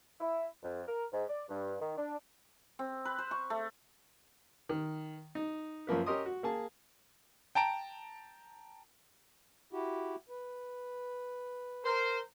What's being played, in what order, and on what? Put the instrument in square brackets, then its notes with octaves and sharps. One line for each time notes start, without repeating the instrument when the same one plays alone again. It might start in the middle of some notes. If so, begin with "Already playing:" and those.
[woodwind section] E4
F2
A#4
G#2
D5
G2
D#3
D4
[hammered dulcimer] C4
B4
C5
C#6
A3
[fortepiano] D#3
D#4
F#2 F3 A#3 B4
C#4 G4 A#4 D#5 C6 D#6
F#4
A#3 G#4 A5
[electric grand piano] G5 A5 A#5 D7
[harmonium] E4 F#4 G4
B4
[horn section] A#4 C5